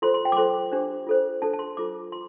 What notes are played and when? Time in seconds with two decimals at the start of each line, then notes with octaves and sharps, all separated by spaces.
0.02 F4 A4 C5 C6
0.14 C6
0.25 G5
0.32 D6
0.37 F4 A4 C5 C6
0.72 D4 G4 C5
1.07 F4 A4 C5
1.42 D4 A4 C5 A5
1.53 A5
1.59 C6
1.77 F4 A4 C5 D6
2.12 F4 C6